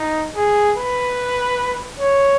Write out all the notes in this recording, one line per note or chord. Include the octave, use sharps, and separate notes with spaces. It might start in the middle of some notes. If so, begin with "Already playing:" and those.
Already playing: D#4
G#4
B4
C#5